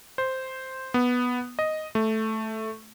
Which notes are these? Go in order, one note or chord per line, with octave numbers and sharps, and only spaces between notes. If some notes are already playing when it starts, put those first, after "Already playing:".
C5
B3
D#5
A3